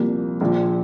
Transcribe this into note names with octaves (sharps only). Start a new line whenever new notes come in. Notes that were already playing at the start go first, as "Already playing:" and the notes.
Already playing: C2 A#2 F3 A#3
A#1 A#2 F3